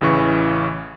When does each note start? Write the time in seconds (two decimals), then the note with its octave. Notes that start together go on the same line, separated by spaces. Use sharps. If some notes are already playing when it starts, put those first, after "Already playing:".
0.01 A1 C#3 E3 C#6